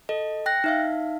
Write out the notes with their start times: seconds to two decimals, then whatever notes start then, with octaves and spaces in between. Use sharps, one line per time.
0.09 A4 D#5
0.46 G5 F#6 A#6
0.64 D#4 E5 F5